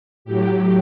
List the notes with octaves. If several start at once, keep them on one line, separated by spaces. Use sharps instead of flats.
A2 F#3 G4